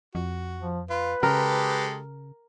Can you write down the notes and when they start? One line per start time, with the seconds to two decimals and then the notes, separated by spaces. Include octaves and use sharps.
0.15 F2 F#4
0.59 F3
0.90 F4 B4
1.23 C#3 G#3 G4 A4 A#4